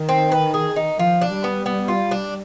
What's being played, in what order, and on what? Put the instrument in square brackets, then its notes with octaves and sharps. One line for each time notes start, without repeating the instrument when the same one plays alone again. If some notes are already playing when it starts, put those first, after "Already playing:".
Already playing: [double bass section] D#3
[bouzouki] C4
B4
G#4
D#4
[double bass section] F3 [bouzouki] F4
[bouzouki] D4
[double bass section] G3
[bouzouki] B3
B3
F4
D4